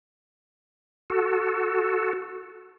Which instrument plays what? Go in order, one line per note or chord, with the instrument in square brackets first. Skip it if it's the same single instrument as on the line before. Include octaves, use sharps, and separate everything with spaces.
[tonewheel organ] F#4 A4